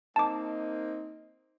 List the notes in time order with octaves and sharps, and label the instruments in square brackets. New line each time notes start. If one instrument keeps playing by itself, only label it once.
[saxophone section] A#3 C4 D#4 [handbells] A5 D6